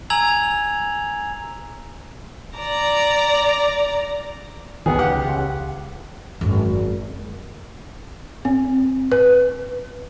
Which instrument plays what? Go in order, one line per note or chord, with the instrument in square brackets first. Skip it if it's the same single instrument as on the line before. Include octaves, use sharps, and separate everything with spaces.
[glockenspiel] G#5 A#5 E6 G#6 F7 F#7
[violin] D5 A#5
[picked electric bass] F1 B1 D#3 [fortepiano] B3 G#4
[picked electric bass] C#2 [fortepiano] G4 F#5
[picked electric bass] C#2
[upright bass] G#1 F#2
[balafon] C4
B4